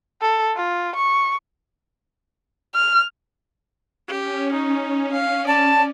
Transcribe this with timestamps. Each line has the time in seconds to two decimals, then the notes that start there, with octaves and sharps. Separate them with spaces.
0.21 A4
0.56 F4
0.95 C#6
2.75 F6
4.08 C#4 G4
4.53 D#4
5.12 F5
5.47 D5 A5